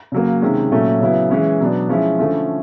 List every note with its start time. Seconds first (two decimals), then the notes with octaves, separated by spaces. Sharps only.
0.12 C#3 F#3 A#3
0.41 C3 D#3 G#3 C#4
0.71 A#2 F#3 A3 C#4
1.00 C#3 F#3 B3 E4
1.30 E3 G#3 C#4 E4
1.60 B2 F#3 B3 D4
1.89 F3 G#3 C#4 E4
2.19 D3 F3 A3 C#4